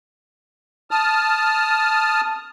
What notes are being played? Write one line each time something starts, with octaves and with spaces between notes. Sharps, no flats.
A5 D#6 F6